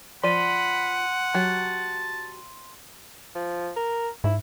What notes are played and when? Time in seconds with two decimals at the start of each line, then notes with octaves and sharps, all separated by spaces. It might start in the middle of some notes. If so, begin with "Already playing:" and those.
0.23 F3 D5 F#5 B5 C6 D#7
1.34 F#3 G4 A5
3.35 F3
3.76 A#4
4.24 G#2 E4